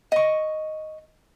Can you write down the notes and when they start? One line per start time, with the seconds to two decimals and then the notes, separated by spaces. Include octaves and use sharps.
0.12 D#5 C#6